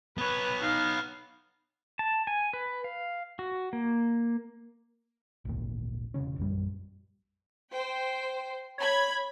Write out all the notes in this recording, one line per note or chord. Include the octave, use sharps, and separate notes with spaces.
B3 B4 C#5
D#4 F5
A5
G#5
B4
F5
F#4
A#3
G#1 D2 A#2
E1 B1 C#3 C#4
A#1 F#2 G3
C5 G5
C#5 B5 G#6